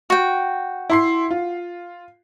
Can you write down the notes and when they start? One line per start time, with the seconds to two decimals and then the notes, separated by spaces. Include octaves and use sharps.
0.10 F#4 G5
0.90 E4 C6 C7
1.31 F4